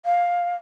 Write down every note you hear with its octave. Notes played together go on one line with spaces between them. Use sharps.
F5